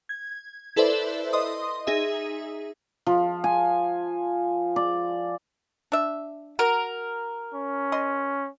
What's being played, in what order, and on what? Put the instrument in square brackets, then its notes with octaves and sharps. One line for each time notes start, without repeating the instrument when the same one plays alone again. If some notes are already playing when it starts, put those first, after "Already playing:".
[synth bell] G#6
E4 A4 B4 C5 D5 E5
D#5 C6 D#6
D#4 G#4 E5
[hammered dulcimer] F3
G#5
D5
[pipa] D4 E5
[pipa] F#4 [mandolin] A#4
[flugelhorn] C#4
[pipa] D#5 C6